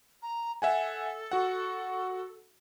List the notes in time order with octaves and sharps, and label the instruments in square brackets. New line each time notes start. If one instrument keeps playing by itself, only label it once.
[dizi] A#5
[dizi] A4 [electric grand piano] E5 F#5 G#5
[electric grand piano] F#4 F#5